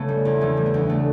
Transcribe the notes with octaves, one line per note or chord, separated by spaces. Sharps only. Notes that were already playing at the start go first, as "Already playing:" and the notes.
Already playing: C#3 A3 B3 C#4
G3
E2
E3 A3 C#4
G3
B3
D2
C#3 A3